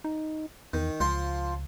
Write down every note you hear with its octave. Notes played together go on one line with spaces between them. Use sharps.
D#4
E2 D#3
C#2 F3 C6